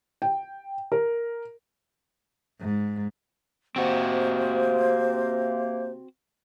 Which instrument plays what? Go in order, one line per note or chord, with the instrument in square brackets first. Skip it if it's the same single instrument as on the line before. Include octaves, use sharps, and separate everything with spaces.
[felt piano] G5
A#4
[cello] G#2
[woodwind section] C3 A#3 [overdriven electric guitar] C4 F#4 [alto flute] C5